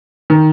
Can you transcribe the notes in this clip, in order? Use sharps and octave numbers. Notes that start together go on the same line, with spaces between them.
D#3